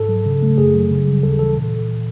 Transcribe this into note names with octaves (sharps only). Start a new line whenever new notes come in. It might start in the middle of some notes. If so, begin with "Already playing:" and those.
Already playing: G#2 A4
F#3
C#3
A3
F#2 G#4
F#3
C#3
G3
D#2 A4
E3 A4
A#2